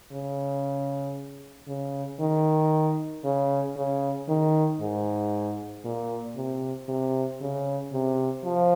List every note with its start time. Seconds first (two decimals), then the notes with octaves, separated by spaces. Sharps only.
0.12 C#3
1.68 C#3
2.20 D#3
3.24 C#3
3.76 C#3
4.29 D#3
4.81 G#2
5.85 A#2
6.36 C3
6.88 C3
7.41 C#3
7.93 C3
8.45 F3